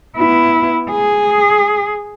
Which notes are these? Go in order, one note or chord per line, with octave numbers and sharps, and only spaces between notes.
B3 E4
G#4